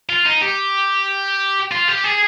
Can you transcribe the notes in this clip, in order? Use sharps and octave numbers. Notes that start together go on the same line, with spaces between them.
F4
D#4
G4
F4
G4
G#4